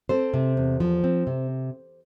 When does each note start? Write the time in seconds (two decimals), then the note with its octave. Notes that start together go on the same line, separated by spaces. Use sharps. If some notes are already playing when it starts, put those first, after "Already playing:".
0.09 C4 A4 C5
0.34 C3
0.57 E2
0.80 F3
1.04 C4
1.27 C3